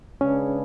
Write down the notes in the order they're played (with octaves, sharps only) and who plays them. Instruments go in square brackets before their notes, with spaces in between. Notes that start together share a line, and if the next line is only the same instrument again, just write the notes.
[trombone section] C#3 G#3 D4 G#4 B4 [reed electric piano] C#4